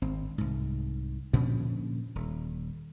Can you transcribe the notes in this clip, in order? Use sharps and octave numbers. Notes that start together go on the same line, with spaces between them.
G#1 C4
C2 G#2
A#2 D3 F3 C#4
D#1